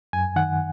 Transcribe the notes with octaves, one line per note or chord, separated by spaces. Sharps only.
F#2 G#5
D#3 F#5